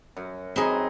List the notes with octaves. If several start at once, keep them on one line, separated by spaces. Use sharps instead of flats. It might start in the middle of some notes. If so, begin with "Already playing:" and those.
F#2
F#2 C4 D#4 G#4 B4